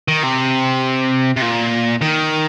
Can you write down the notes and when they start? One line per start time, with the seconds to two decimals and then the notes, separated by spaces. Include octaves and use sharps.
0.08 D#3
0.23 C3
1.37 C3
1.42 A#2
2.01 D#3